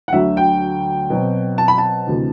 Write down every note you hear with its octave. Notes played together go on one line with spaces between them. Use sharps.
F#5
D2 D3 F#3 E5
G5
B2 F#3 C4
A5
B5
A5
D2 C3 E3